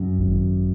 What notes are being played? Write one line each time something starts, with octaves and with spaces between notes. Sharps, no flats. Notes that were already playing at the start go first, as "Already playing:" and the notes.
Already playing: F#2
G#1